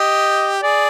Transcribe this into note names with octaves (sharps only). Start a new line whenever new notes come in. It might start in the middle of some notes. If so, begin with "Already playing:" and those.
Already playing: G4 D#5
G#4 D5